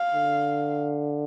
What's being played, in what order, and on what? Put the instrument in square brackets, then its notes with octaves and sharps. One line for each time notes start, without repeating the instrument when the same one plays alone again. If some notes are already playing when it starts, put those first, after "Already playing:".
Already playing: [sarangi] F5
[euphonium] D3